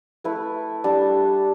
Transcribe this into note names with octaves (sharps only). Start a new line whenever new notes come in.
A3 E4 B4
G3 D4